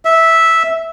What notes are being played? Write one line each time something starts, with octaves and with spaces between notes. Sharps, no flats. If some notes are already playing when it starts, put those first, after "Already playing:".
E5